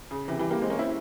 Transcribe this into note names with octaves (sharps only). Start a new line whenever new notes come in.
C#3
C3 E3
E3 G3
G3 A#3
G#3 C4
A#3 C#4
C4 E4